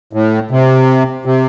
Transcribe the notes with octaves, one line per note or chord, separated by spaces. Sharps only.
A2
C3
C3